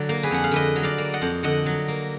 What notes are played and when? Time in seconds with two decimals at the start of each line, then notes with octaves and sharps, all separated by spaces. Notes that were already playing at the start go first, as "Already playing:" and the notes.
Already playing: D3 F#3 D5
0.09 A#3
0.23 G#4 B4
0.31 F2 F#5
0.44 F5
0.51 D3 B4 D#5
0.76 F#3
0.83 D5 F5
0.98 A#3
1.13 D#5 F#5
1.22 F2
1.43 D3 D#5 F#5
1.66 F#3
1.88 A#3